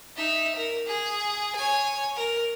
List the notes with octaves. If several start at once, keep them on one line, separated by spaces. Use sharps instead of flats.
D#4 E5
A#4
G#4
C#5 G#5
A#4